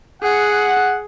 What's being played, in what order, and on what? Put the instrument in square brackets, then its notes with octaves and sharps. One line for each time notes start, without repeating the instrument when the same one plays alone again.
[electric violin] G#4 [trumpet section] F#5